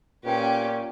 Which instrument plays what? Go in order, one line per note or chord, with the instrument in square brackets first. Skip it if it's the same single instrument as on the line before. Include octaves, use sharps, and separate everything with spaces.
[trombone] A#2 [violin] C#4 G4 [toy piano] B4 G5